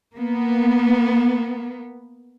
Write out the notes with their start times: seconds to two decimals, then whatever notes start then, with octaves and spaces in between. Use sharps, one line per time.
0.15 A#3 B3